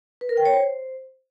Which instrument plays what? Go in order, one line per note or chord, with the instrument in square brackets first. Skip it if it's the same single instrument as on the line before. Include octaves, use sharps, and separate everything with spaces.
[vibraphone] B4
A#4
G5
C#5
C5